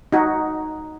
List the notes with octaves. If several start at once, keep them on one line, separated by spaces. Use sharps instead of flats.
D#4 F#4